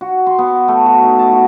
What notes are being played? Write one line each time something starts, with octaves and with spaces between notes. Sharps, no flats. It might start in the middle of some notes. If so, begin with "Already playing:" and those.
F#4
C6
B3
A3
F#4
D#4
A5
F#4